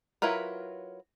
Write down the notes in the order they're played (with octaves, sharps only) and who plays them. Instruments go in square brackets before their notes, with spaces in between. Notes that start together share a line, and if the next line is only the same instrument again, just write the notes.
[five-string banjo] F#3 E4 F4 A#4 B4